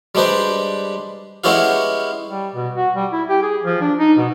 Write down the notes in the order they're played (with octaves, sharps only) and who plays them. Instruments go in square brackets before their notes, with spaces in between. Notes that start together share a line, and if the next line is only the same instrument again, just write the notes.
[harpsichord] G3 G#3 D4 G4 B4 C5
G#3 B3 C#4 E4 G4 F5
[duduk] G3
B2
F#4
G3
E4
G4
G#4
F3
D4
D#4
B2